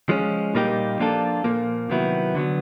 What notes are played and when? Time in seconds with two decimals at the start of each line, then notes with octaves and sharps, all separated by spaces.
0.09 F3 G#3 C#4
0.55 A#2 G3 A#3 D#4 G4
0.99 F3 A#3 D4 F4 A4
1.44 A#2 F3 A#3
1.90 C3 D#3 F#3 B3 E4
2.35 D3 F#3 B3